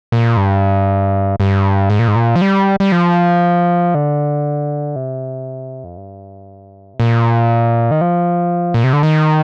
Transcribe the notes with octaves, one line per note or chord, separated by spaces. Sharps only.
A#2
G2
G2
G#2
A#2
G#2
A#2
F3
G3
G3
F3
D3
C3
F2
G2
C3
A#2
D#3
F3
A#2
C3
D3
D#3